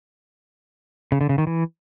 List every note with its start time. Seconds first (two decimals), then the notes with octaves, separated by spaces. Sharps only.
1.12 C#3
1.21 D3
1.29 C#3
1.38 D#3
1.47 E3